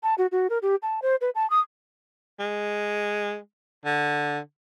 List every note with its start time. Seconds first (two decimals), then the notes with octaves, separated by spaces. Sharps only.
0.03 A5
0.18 F#4
0.32 F#4
0.50 A#4
0.62 G4
0.82 A5
1.02 C5
1.21 B4
1.35 A5
1.50 D#6
2.40 G#3
3.85 D3